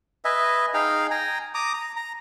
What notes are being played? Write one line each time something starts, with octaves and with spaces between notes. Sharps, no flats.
B4 D#5 E5 G#5
D#4 G#4 F5 G5
G5 G#5 A#5
A#5 D6 D#6
A#5
A#5